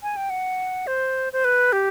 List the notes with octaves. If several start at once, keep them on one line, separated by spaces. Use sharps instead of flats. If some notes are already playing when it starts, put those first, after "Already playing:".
G#5
G5
F#5
C5
C5
B4
G4